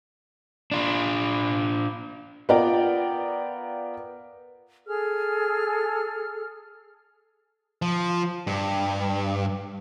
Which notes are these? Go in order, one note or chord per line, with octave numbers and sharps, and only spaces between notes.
D4 F4
B3 F4 A#4 D5 G5 A#5
G#4 A4 F6
F3
G2